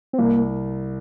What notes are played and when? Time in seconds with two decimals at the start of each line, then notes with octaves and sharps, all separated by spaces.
0.13 C4
0.18 C2 A#3